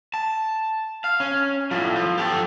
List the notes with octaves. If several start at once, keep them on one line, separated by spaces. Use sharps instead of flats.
A5
F5
C#4
A2 F3
F3
G4 A4